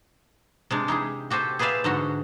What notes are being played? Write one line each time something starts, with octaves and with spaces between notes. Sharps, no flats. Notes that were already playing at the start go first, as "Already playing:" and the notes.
C3 G#3 D4
D#4 E4 G4 G#4
F#4 G4 A4 C5 G#5
G#4 B4 C5 D5 E5 F5
G#2 D3 F#4